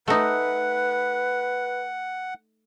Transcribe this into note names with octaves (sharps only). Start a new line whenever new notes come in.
A3 D#4 B4 F#5